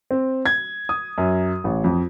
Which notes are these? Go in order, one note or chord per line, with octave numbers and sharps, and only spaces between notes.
C4
G#6
D#6
F#2
A1
F2